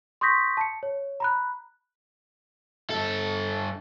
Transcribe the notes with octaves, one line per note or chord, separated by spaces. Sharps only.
C6 C#6 D#6 G6 A#6 B6
A5 C#7
C#5
A#5 B5 F#6
G2 A4